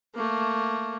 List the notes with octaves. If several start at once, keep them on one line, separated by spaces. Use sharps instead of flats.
A3 A#3